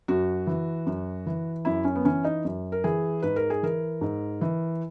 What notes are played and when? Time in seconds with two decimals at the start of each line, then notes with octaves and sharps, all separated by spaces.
0.08 F#2 F#4
0.47 E3
0.86 F#2
1.26 E3
1.65 F#2 E4
1.85 C#4
1.95 B3
2.05 E3 C#4
2.24 D#4
2.45 F#2
2.72 A#4
2.84 E3 G#4
3.22 G#2 B4
3.36 A#4
3.50 G#4
3.63 E3 A#4
4.01 G#2
4.41 E3